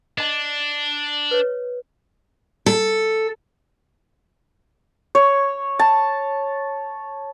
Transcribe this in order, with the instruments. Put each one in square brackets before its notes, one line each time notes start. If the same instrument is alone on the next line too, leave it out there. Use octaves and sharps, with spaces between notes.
[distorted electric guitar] D4 [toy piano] D#5 A5
[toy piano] B4 C#5
[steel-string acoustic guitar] A4
[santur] C#5
A5